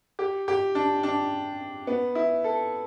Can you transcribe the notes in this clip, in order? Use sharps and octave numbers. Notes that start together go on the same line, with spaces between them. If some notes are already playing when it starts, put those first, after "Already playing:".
G4
G4
D4
D4
B3
E4
A4